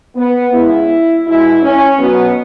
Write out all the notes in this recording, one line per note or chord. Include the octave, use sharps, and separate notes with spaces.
B3
C#3 G#3 E4
B2 G#3 E4
C#4
B2 F#3 B3